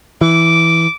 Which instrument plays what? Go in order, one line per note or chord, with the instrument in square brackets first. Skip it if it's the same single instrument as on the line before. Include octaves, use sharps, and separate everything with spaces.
[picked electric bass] E3 [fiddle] D6